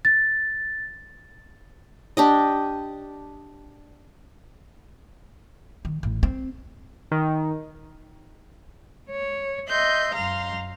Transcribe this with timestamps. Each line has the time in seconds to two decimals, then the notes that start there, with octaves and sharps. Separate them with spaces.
0.05 A6
2.17 D4 G4 D#5
5.85 D#3
6.03 A1
6.23 C4
7.11 D#3
9.10 C#5
9.68 D#5 E5 C6 G6
10.15 F#2 F5 A#5 C6